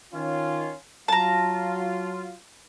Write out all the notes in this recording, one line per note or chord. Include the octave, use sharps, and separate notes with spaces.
D#3 C#4 F4
F#3 F4 A5 A#5